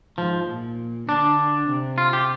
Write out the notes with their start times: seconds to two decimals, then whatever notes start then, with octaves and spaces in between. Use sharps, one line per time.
0.18 G#2 F3
0.48 A#2
1.07 D3 D4
1.69 C3
1.98 F4
2.13 G4